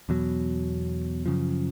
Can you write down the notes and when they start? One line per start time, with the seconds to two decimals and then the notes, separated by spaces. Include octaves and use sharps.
0.09 E2 B2 F#3
1.26 F#2 C#3 F3